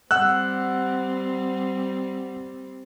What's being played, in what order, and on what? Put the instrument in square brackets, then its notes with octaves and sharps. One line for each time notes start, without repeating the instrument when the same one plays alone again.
[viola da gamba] G3 C4 [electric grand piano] F#5 E6 F#6